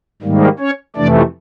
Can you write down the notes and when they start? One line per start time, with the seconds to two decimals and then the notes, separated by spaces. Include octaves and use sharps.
0.22 G#2 D#3 G3 A#3
0.59 C#4 C#5
0.96 F2 C3 E3 A3 D4 D5